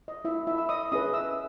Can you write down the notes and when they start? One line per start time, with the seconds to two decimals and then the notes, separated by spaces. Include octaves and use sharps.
0.08 D#5
0.25 E4 E5
0.47 E4 E5
0.58 E6
0.69 D#5 D#6
0.92 C#4 G#4 B4 D#5 D#6
1.13 E5 E6